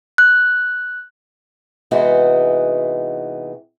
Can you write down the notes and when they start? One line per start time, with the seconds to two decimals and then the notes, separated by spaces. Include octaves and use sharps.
0.18 F#6
1.91 C3 E3 G#3 B3 D#4 F#4